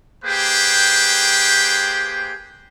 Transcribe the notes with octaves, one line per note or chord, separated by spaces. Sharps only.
A#3 G4 G#4 B4 C5 G5